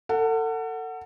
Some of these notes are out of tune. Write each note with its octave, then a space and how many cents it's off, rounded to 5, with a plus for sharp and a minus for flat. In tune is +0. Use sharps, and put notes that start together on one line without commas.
A4 +35 F#5 +0